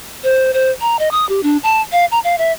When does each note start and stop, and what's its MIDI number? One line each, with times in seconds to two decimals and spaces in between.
0.24 0.54 72
0.54 0.71 72
0.81 0.99 82
0.99 1.09 75
1.12 1.27 87
1.29 1.41 67
1.43 1.57 62
1.63 1.82 81
1.92 2.05 77
2.11 2.19 82
2.24 2.38 77
2.38 2.52 76